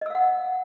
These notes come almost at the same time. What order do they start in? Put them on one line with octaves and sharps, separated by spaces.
D#5 E6 F5 F#5